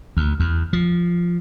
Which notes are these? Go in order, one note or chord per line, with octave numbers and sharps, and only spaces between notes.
D2
E2
F3